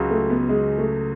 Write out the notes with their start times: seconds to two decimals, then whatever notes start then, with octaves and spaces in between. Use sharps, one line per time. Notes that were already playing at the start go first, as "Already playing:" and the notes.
Already playing: C#2 C#3 F#3
0.11 A3
0.30 B3
0.49 G#3
0.78 A3